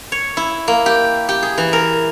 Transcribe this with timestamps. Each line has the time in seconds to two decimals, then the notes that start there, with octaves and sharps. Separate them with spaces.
0.12 C#5
0.37 E4
0.68 A#3
0.86 G4
1.29 G4
1.43 G#4
1.58 E3
1.73 A#4